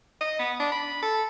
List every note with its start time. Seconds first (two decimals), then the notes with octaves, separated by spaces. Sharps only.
0.21 D#5
0.39 B3
0.60 D4
0.72 B5
1.02 A4